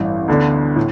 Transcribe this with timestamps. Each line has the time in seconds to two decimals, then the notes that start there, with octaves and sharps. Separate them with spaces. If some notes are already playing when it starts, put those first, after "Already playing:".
Already playing: A1 G2 E3
0.28 D2 D3 B3 D4
0.76 A2